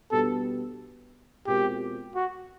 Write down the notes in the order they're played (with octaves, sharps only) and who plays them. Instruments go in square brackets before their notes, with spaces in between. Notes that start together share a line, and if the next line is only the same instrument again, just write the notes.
[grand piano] B2 G3 B3 D4 G4 [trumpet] A4
[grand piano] B2 G#3 C4 F4 A#4 [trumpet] G4
[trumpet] F#4